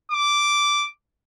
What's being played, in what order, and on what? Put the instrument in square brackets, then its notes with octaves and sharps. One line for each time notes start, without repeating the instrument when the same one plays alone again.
[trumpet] D6